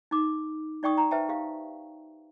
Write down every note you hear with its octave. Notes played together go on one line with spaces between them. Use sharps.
D#4 D6
D#4 D5 G5 C#6 D#6
A#5
B4 C5 E5 G5 A5
G4 F5